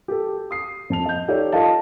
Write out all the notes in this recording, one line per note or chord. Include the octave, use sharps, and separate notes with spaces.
G4 A4
D#6 C7
F2 A5 F7
D#5 G6
D#4 G4 A4 C#5 D5
F4 A4 D#5 F5 A5